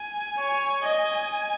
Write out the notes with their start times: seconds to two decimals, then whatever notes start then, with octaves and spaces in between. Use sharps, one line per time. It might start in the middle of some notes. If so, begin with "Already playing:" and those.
Already playing: G#5
0.37 C#5
0.83 D#5